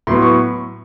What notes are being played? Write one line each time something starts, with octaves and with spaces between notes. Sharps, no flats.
A2 F#3 B3 C6
C#6